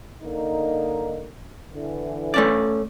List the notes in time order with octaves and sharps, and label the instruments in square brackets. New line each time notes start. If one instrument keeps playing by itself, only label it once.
[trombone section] D3 A#3 D#4
D3 E3
[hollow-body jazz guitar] A3 C#4 D5